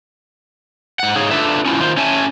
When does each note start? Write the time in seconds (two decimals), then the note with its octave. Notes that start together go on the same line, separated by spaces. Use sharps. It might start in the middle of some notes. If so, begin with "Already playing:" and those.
1.00 G#2 F#5
1.16 G#2 D#4 G#4 C#5 F5
1.31 D4 F4 A4 B4 E5
1.66 C#4 E4 F4
1.80 D#3 F4 C5
1.97 C#4 C#5 E5 G#5 A5